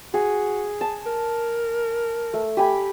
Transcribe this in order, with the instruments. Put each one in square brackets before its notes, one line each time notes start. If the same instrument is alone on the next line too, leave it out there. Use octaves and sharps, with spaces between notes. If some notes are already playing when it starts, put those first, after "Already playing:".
[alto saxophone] F#4 [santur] G#4
[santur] A5
[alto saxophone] A#4
[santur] A3
G4 G#5 B5